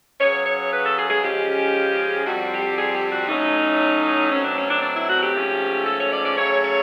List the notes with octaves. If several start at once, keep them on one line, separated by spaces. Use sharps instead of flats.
C#3 F#3 B3 C#5
C#5
B4
A4
G#4
G#4
C#3 F3 G#3 C#4 G4
F2 D3 G3 C4 F#4
G4
G#4
G4
F#4
A2 F#3 A3 C#4 D#4
B2 F#3 A3 C4 C#4
D4
C#4
D4
D4
E4
F#4
G4
G#2 F3 A3 C#4
A4
C#5
D5
D5
C#3 F#3 A3 C#4 C#5
C#5